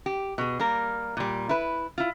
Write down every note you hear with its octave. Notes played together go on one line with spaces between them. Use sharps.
G4
B2 G#4
G3 A#3 A#4
A#2 G3
E4 B4
E4 F4